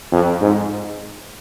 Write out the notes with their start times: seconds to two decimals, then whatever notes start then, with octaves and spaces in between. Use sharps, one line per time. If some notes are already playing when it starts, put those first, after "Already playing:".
0.12 F2
0.41 G#2